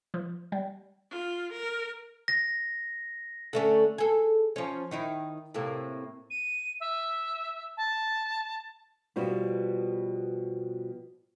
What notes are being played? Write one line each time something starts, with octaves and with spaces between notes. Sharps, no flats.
F3
G3
F4
A#4
A#6
D3 A3 C#4
G#4 A4
F3 C#4
D#3 D#4 E4
A2 C3 A#3
D#7
E5
A5
B2 F3 G3 B3